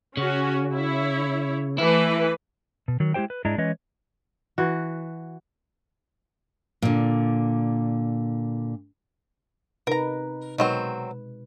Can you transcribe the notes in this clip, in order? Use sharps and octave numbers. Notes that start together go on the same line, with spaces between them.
C#3 C#4 F#4
E4 C#5
E3 A3 E4 B4
B2
D#3 F#3
G#3 E4 G4 C5 G5
B4
G#2 G#3 D4 E4 D#5 A#5
E3 G#3 C#4 B4 C#5 D#5
E3 F#4
A#2 D3
C3 D#4 A#4 B4 A#5
B2 D#3 F#3 G#3 C4 B4